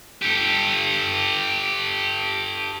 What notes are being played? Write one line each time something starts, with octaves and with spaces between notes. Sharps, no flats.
G4 A4